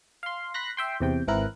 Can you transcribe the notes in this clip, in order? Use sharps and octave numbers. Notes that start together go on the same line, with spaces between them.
F5 C6
B5 C6 F#6 A#6
E5 G5 C6
E2 C3 G5
G#1 E3 C4 E4 A#4 F#6